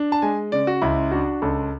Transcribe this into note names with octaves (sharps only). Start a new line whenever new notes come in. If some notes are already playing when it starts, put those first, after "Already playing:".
Already playing: D4
A5
G#3 G#5
C#3 D5
F#4
C#2 E4
D4 F#4
C#2 A4